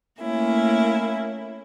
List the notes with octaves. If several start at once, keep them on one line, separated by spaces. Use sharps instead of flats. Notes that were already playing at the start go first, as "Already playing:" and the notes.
A3 A#3 C#4 E4